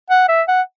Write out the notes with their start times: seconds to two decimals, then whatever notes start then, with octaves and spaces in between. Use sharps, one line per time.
0.10 F#5
0.29 E5
0.48 F#5